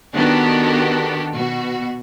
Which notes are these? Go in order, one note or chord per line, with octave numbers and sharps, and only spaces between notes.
D#3 B3 D4 F#4 G4 A4
B2 F#4